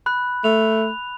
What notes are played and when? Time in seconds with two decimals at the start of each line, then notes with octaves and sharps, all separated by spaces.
0.06 B5 F#6
0.44 A3 F7